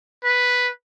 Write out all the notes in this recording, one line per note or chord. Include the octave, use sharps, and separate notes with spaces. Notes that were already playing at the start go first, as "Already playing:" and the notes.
B4